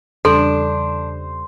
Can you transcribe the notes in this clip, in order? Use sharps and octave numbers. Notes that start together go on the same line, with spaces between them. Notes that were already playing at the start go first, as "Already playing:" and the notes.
E2 C#3 G3 D4 A4 C5